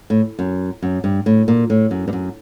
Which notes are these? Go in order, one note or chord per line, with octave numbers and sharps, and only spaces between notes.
A2
F#2
F#2
G2
A2
A#2
A2
F#2
G2
F#2